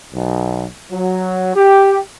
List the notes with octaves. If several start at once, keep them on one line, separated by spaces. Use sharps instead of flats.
B1
F#3
G4